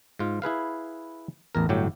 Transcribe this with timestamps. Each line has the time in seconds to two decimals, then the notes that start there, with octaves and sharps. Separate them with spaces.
0.19 G#2 F4
0.42 E4 G#4 B4 F5
1.55 A1 E2 A#4
1.69 G1 A2 F#3 G4